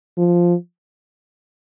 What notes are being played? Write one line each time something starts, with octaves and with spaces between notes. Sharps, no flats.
F3